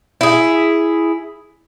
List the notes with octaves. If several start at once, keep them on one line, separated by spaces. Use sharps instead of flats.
E4 G#4